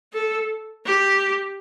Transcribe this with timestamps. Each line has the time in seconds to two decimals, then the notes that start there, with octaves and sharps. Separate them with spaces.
0.14 A4
0.86 G4